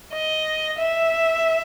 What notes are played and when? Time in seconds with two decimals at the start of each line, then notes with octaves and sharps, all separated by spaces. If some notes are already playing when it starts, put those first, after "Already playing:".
0.13 D#5
0.78 E5